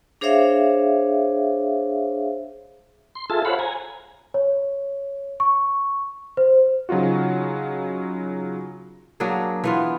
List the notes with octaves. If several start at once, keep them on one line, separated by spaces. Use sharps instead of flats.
D4 G#4 C5 C#5 E5 F5
C6
F4 G#4 A4 E5 A5
C5 C#5 F5 F#5 B5
G#5 A#5
C#5
C#6
C5
C#3 F#3 D#4 F4 F#4
F#3 A#3 D4 G#4
E3 B3 F4